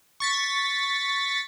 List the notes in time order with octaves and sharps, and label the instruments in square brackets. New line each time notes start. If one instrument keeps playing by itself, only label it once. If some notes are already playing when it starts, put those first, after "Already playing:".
[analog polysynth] C#6 A6 B6